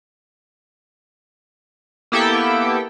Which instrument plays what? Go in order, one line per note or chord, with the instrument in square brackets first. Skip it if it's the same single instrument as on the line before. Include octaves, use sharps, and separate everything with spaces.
[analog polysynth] A#3 B3 E4 G4 A4 G5